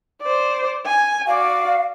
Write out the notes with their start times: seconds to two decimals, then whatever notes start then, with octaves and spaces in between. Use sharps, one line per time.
0.22 C5 D5
0.86 G#5
1.27 F#4 D5 F5